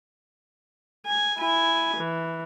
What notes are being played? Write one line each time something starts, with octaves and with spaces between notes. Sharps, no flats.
G#5
E4 G#5
E3